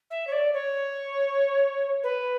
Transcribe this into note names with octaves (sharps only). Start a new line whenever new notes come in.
E5
C#5
D5
C#5
B4